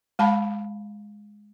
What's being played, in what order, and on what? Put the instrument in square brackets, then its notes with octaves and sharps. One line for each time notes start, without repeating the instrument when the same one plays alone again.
[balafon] G#3 F5 A5 B5